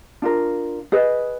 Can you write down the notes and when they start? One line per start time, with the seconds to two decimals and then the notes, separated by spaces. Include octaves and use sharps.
0.22 D4 F4 A#4
0.92 G#4 B4 D#5